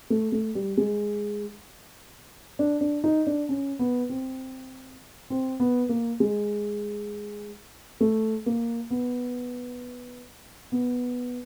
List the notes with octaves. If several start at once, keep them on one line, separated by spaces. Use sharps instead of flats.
A3
A3
G3
G#3
D4
D4
D#4
D4
C#4
B3
C4
C4
B3
A#3
G#3
A3
A#3
B3
B3